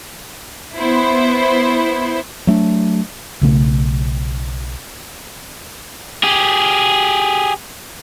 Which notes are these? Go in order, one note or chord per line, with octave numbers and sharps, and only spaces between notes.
B3 E4 C5
F#3 A3 D4
B1 C#3 A3
G4 G#4